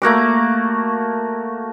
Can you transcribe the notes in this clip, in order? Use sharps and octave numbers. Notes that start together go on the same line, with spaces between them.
A3 A#3 F#4 D6